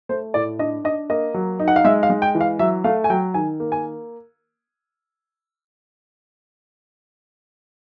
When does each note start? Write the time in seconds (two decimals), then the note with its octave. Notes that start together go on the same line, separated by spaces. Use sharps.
0.09 A3 C5
0.34 A2 D5
0.59 D4 D#5
0.84 D4 D#5
1.10 A#3 D#5
1.34 F#3
1.59 D#4
1.68 F#5
1.76 F5
1.84 G#3 E5
2.03 F5
2.10 G#3
2.22 G5
2.35 E3
2.41 F5
2.59 F#3 E5
2.84 A3 F5
3.04 G#5
3.10 F#3 G5
3.34 D#3 G#5
3.60 A#3
3.72 G#5